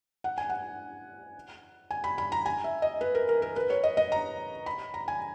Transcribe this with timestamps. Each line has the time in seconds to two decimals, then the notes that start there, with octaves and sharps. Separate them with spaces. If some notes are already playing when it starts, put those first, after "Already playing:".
0.24 F#5
0.38 G#5
0.50 F#5
1.91 G#5
2.04 B5
2.18 B5
2.32 A#5
2.46 G#5
2.64 E5
2.82 D#5
3.01 B4
3.15 A#4
3.29 A#4
3.42 A#4
3.56 B4
3.70 C#5
3.83 D#5
3.97 D#5
4.12 A#5
4.66 B5
4.94 A#5
5.08 G#5